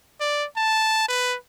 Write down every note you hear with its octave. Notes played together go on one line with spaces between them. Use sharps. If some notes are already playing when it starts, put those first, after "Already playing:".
D5
A5
B4